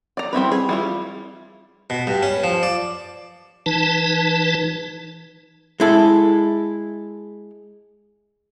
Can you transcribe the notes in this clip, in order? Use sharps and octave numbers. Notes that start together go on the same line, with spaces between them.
D5 A#5
G3 C4 E4 B4
G#4
G3 E4 F4
B2
G2
C#4
F3
D5
E3 D#4 B4 A5
G#3 E4 A4